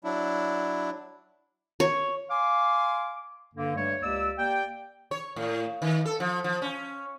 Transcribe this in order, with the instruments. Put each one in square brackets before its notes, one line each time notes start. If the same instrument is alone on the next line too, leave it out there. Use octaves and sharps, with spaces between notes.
[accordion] F#3 D4 E4
[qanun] C#5
[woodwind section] F5 G#5 C6 D6
G2 D3 A#3
G2 G3 A3 C#5
C#2 A#3 G4 D5 E6
A#3 G4 D5 G5
[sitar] C#5
A2
D#3
A4
F3
F3
C#4